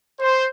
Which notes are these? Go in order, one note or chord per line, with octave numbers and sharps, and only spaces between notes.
C5